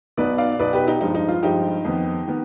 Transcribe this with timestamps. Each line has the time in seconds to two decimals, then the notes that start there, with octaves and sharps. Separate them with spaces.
0.17 B1 B2 B3 D#4 B4 D5
0.38 D5 F5
0.59 B1 B2 B3 D#4 B4 D5
0.73 G4 B4
0.87 D#4 G4
1.01 G2 F3 G#3 D#4
1.15 D#4
1.29 F4
1.43 G2 F3 G#3 D#4 G4
1.85 F2 D#3 B3
2.28 D#3 B3